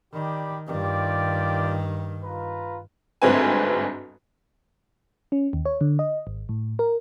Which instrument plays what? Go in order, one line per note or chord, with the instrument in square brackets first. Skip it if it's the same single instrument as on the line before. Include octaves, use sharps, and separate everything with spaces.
[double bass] D#3 [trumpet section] G4 D5 B5
[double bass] G2 D#3 [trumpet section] F4 G4 D5
[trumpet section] F4 B4 A#5
[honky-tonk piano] G1 D2 G#2 C4 B4 G#5
[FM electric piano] C#4
D#2
C#5
D3
D#5
G#1
A2
A#4